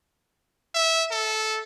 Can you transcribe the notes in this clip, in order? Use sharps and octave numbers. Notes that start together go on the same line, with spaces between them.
E5
A4